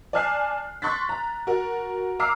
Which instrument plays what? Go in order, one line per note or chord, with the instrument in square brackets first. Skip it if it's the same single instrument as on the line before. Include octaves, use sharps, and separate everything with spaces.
[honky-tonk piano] D5 G#5 A5 F6 F#6 C7
C6 C#6 F#6 A6 B6
A#5
F#4 A#4
A#5 D6 E6 F6 C7